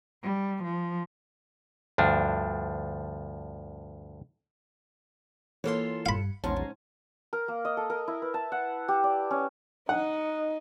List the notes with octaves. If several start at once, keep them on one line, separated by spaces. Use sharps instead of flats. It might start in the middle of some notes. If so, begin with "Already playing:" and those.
G3
F3
D2 G2 F3 D4
E3 A#3 F4 A4 C#5 C6
G2 F5 B5 C#7
A#1 E2 G#2 C#4 A5 A#5 C6
A#4
A#3
D#5
A4
A#4
E4
B4
A5
F#5
G4
D5
C#4
D#4 F#5